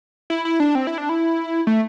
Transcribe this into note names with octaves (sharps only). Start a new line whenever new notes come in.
E4
E4
D4
C4
E4
D4
E4
A3